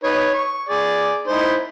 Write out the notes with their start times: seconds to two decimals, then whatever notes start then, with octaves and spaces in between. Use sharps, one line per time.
0.04 D#4 B4 C#5
0.34 C#6
0.69 G#4 D5
1.27 D#4 E4 C5